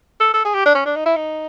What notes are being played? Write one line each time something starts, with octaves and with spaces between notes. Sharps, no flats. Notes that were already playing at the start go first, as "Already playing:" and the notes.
A4
A4
G#4
G4
D4
C#4
D4
D#4
E4
D#4